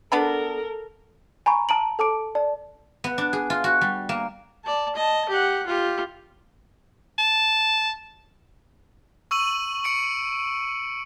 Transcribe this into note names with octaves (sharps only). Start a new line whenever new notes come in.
B3 D4 A4 A#4 B5
G#5 A#5 B5 C#6
A5 A#5 D7 F#7
A4 A5 D6 D7
D5 A5
B3
D4
G#4
F4
F#4
G3
A#3
D5 A5
D#5 A5
G4 F#5
F4 G4
A5
C#6 E6 D#7 F#7
C#6 C#7 D7